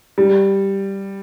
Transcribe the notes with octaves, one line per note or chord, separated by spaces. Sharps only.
G3